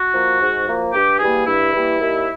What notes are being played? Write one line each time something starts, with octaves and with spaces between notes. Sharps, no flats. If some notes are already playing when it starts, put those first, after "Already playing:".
Already playing: F#4
F3 A#3
G#2
F3 A#3
G2 G4
E3 G3 A#3 G#4
G2 E4
E3 G3 A#3
D#2